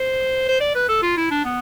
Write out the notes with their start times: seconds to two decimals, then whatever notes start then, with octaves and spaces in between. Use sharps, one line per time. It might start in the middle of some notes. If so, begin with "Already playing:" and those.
Already playing: C5
0.48 C5
0.60 D5
0.75 B4
0.88 A4
1.02 F4
1.17 E4
1.31 D4
1.44 B3